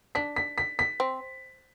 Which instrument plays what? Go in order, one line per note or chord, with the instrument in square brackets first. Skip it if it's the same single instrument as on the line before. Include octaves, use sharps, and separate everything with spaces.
[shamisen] D4 [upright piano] B6
[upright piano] B6
B6
B6
[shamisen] C4